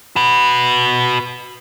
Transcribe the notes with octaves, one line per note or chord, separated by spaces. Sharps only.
F#4 B4